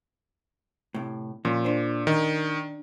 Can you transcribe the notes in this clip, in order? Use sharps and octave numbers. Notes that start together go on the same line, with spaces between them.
A2 C3
A#2 F3 C#4
D4 C5
D#3